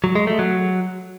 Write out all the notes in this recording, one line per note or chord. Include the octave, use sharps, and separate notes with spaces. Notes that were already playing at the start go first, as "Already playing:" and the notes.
F#3
G#3
A3
F#3